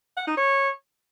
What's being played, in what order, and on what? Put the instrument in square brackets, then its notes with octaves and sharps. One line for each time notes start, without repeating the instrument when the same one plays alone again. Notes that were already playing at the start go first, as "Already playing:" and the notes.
[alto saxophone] F#5
D#4
C#5